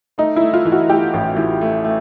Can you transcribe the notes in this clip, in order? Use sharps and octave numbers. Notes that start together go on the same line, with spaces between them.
A3 D#4
A3 E4
F4
E3
F#4
A3 G4
A1
E3
A3
A3